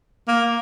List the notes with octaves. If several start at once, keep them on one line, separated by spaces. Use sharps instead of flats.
A#3